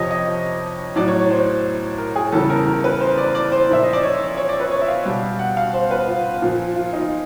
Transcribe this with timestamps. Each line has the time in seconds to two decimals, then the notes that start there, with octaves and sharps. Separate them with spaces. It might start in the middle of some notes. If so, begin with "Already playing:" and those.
Already playing: F2 C3 F3 G4 C#5 D#5
0.11 D#5
0.96 A2 F#3 D5
1.07 C#5
1.19 C#5
1.31 C5
1.98 A#4
2.16 G#4
2.32 E2 C#3 E3 G3 A4
2.50 A#4
2.67 A#4
2.84 B4
3.00 C5
3.18 D5
3.35 D5
3.52 C5
3.69 A#2 F3 E5
3.83 D#5
3.93 D5
4.03 C#5
4.37 C#5
4.49 D5
4.60 B4
4.71 C#5
4.82 E5
4.88 F5
5.05 B2 G3
5.39 F#5
5.57 F5
5.74 C5
5.91 B4
6.08 F4
6.42 A#2 F3
6.76 F4
6.93 D#4